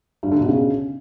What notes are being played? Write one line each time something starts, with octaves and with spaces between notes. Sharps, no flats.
G2
D3
B2
C#3